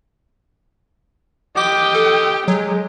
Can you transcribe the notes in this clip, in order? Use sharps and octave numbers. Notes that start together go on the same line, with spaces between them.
G4 D#5 G5 D6
A4
F#3 G#3